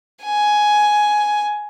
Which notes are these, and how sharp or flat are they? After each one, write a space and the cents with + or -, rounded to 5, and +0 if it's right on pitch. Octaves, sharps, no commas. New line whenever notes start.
G#5 +10